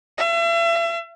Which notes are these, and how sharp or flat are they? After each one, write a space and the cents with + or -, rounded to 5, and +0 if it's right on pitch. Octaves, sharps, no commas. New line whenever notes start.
E5 +40